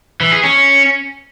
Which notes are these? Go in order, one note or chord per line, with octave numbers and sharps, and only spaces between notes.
E3
G#4
C#4